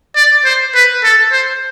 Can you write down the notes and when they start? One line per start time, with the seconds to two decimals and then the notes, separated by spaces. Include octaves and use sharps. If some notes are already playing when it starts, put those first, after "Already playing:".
0.16 D5
0.45 C5
0.75 B4
1.04 A4
1.32 C5